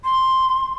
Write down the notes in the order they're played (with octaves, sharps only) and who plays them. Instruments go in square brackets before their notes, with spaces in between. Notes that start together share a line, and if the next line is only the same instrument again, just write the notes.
[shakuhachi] C6